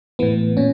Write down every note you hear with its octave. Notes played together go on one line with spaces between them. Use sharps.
A2 E3 B3
A#2 C#4